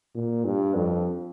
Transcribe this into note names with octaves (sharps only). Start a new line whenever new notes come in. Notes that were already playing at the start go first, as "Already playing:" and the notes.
A#2
G2
F2